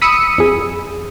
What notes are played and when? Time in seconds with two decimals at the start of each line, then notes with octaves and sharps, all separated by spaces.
0.02 B5 D#6 E6 C#7 D#7
0.38 F2 G#4